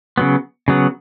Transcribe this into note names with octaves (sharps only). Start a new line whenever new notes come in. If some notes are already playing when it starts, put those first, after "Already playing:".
C#3 F#3 B3
C#3 F#3 B3